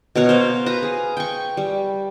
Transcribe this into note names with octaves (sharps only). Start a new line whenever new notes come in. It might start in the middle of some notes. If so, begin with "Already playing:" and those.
B2 A#4 C#5 F#5
C5 F5
B4 A#5
G#4
G5 C#6
G3